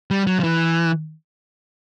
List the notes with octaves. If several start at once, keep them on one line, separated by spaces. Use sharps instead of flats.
G3
F#3
F3
E3